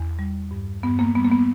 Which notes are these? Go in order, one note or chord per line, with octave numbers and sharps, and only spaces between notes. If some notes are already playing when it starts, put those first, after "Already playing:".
Already playing: E2
G3
G2
G2 B3
A#3
G3 B3
A#3
B3